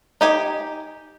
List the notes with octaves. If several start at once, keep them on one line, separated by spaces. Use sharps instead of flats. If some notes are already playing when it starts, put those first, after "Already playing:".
D#4 G4 G#5